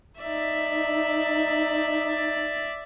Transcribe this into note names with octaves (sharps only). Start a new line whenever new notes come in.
D#4 D5 E5